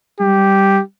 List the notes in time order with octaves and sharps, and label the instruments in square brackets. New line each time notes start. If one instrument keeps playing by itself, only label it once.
[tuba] G3 [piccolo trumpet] G4